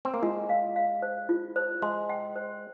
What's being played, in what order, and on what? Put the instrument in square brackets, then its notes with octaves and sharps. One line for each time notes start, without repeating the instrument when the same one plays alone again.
[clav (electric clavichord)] C4
A#3
[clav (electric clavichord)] G#3 [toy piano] F4
[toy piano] F5
F5
C5
F4
C5
[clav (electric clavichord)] G#3 [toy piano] C6
[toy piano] G5
C5